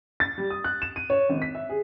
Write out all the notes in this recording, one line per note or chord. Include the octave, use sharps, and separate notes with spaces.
A6
G3
D#6
F#6
E7
D#7
C#5
G#1
B6
E5
G#4